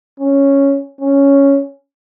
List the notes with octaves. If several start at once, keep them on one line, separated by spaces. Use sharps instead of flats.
C#4
C#4